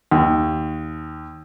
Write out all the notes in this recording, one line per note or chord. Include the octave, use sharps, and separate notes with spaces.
D#2